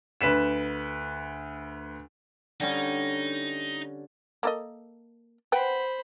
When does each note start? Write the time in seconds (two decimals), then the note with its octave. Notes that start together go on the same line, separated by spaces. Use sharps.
0.21 D2 B4 B6 E7
2.60 D3 G3 C#4 D#4
4.43 A#3 A4 D#5
5.52 B4 C5 F#5 G5 B5